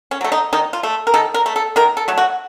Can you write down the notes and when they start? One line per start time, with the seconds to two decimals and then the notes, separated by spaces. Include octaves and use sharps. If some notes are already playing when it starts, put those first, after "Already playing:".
0.11 C#4
0.21 F#3 A3
0.32 D#4
0.53 D#3 D#4
0.73 F4
0.83 A3
1.07 A#4
1.14 D#3 A4
1.34 A#4
1.46 A3
1.56 A4
1.76 D#3 A#4
1.97 A4
2.08 F#3 A3
2.18 F#4